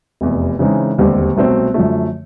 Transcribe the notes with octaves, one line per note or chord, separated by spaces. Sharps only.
F1 E2 C3
C#3 E3 G#3 C4 D#4
E1 D#2 D3 G3 C4
C2 B2 F#3 A3 C4
F#2 D3 F3 A3